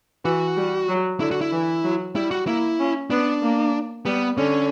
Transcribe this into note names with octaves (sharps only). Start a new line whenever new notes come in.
E3 F#4
G3
F#3
D3 E4
F#4
E4
E3
F#3
G3 E4
F#4
A#3 E4
C#4
B3 D4
A#3
G3 B3
D3 C#4